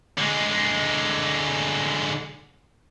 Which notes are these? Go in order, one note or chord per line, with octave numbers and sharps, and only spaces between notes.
D3 G#3